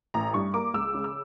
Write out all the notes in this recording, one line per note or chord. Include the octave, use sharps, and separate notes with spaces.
A1 A#5
G2 C#6
A#3 D6
C#2 E6
C#3
E6